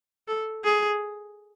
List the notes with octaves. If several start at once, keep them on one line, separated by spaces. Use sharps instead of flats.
A4
G#4